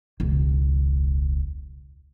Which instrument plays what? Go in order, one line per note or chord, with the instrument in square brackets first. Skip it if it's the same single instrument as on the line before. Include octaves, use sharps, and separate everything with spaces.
[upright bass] E1 C#2